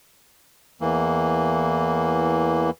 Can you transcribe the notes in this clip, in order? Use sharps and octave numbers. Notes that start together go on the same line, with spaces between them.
E2 E3 A#3